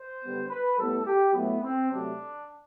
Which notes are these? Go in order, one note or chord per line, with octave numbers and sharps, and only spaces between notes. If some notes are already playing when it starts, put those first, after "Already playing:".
Already playing: C5
D3 G3 B3
B4
A2 G3 B3 A4
G4
A2 F#3 A3 B3
C4
C3 F#3 A3 D4